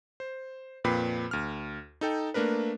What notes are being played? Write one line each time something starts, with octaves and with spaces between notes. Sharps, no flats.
C5
F2 A#2 B4 G5 B5 C7
D2 F6
D#4 A4 G5
A3 A#3 D4 A#4 B4